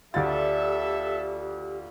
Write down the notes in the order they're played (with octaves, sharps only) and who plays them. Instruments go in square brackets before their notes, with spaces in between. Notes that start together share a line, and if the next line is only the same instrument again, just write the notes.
[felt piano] D2 A6 [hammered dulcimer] F4 D5 [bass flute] G4 [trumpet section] A4 E5